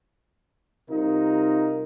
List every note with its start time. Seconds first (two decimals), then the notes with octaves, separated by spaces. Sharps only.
0.89 C3 G3 D#4 F4 A#4